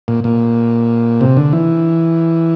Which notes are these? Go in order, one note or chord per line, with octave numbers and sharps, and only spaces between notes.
A#2
A#2
C3
D3
E3